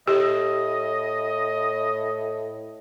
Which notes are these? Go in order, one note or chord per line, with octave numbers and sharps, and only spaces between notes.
A2 G4 D#5